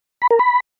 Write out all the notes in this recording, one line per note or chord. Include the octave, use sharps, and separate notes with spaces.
B5
A#4
B5